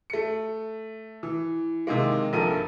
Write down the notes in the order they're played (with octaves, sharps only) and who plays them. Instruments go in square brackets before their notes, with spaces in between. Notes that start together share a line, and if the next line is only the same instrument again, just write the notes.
[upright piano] A3 C#7
E3
C3 D#3 G#3 A#3
A#1 G2 A4 A#4 D#7